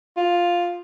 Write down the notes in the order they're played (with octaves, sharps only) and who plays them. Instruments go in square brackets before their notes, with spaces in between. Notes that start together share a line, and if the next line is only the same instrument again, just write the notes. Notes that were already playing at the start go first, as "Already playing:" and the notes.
[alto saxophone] F4